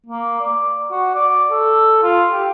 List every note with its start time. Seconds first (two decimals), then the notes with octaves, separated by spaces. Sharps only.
0.06 A#3
0.40 D5
0.91 F#4
1.15 D5
1.51 A4
2.03 F4
2.31 G4